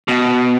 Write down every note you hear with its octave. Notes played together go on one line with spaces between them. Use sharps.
B2